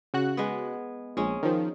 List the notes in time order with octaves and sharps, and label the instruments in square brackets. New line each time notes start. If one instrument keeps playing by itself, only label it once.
[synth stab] C#3 F#4 F#6
[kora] G#3 B3
[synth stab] A#1 [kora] G#3 C#4
[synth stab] D#3 F3